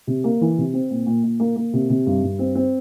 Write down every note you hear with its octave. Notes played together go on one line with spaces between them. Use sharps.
C3
A#3
E3
C3
C4
A#2
A#2
A#2
A#3
A#3
C3
C3
G2
G2
C4
C4